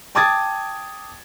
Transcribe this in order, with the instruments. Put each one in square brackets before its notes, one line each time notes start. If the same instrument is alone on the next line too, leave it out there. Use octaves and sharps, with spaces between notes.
[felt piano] G5 A5 D6 D#6 G#6 A6